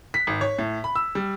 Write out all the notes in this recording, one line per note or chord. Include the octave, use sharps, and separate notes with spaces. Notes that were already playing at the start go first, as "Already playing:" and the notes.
B6
G#1
C#5
A2
B5
E6
G3